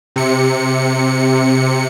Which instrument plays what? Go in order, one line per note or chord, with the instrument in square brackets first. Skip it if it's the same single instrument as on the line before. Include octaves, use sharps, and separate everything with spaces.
[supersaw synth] C3 C#7